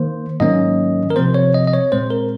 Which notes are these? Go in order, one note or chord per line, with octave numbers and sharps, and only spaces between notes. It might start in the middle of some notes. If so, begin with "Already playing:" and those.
Already playing: D#3 A#3 C5
G#2 D#3 F#3 A#3 C#4 D#5
A#4
C3 F3 C4 C5
C#5
D#5
D#5
C#5
A#2 G#3 C4 C5
A#4